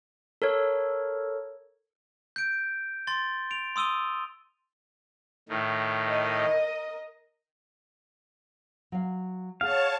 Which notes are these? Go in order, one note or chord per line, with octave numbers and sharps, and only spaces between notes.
A4 A#4 C#5
G6 D7
C6 A6 G7
D7 F7
C6 D#6 E6 D#7 G7
A2 D#3
A#4 D#5
F#3 F5
G#4 C#5 F5 F#5 A5